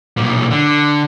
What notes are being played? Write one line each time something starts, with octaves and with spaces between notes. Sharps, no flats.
B1 A#2
D3